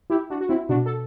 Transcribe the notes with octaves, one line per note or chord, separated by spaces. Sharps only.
E4 G4
D4 F#4
F#4
C4 E4
B2 D4 F#4
A4